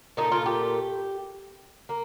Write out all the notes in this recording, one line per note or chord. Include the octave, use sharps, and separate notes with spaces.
A#2 A3 D#4
F4
G4
A#3